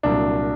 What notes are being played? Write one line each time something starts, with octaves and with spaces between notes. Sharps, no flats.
C2 A#2 F#3 D4